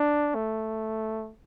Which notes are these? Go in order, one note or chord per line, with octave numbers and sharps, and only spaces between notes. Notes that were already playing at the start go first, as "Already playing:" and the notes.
Already playing: D4
A3